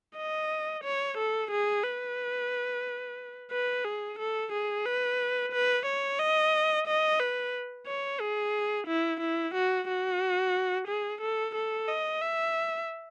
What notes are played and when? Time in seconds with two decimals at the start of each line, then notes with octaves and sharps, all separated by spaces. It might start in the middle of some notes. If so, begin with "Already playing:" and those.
0.17 D#5
0.84 C#5
1.18 A4
1.51 G#4
1.84 B4
3.51 B4
3.85 G#4
4.19 A4
4.52 G#4
4.86 B4
5.52 B4
5.86 C#5
6.19 D#5
6.87 D#5
7.20 B4
7.87 C#5
8.20 G#4
8.87 E4
9.21 E4
9.55 F#4
9.88 F#4
10.88 G#4
11.21 A4
11.55 A4
11.88 D#5
12.22 E5